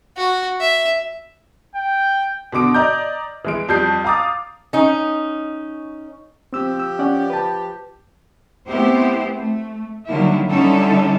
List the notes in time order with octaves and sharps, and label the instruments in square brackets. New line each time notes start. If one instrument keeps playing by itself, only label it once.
[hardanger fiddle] F#4
E5
[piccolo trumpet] G5
[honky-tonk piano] B2 D3 D6 D7
D5 D#5 A#5 G6
E3 G#3 D7
F2 G3 G6 C7
F5 A#5 D6 D#6 A6
[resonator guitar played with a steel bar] C#4 D#4
[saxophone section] F3 G4 [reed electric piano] C4 E6
[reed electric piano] E6
C#4 D5 F#5
B4 A5
[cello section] A3 B3 C4 E4 G4 C5
A3
D3 D#3 F#3 G3 A#3 E4
D3 G3 C#4 D#4 E4 A4